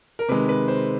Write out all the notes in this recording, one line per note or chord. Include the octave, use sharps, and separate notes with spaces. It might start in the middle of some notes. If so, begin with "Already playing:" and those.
A#4
C3 D#3 G#3 B4
B4
C5